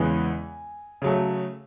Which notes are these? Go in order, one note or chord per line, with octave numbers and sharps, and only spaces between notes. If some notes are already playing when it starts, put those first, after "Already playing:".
Already playing: E2 C#3 E3 G#3 B3 G#5
C#3 F#3 A3